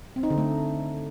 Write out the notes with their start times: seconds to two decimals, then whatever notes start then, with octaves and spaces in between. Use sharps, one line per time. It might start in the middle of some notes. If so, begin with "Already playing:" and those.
0.16 C4
0.23 D#4
0.31 D3
0.38 A3